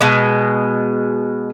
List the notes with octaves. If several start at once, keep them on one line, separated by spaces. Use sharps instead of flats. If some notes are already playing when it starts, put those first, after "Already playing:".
B2 G#3